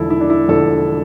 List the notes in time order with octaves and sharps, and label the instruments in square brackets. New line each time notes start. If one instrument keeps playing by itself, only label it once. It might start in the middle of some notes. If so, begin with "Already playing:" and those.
Already playing: [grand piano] E1 E2 D3 F3 E4 A4
E4
D4
E4
E1 E2 D3 F3 A4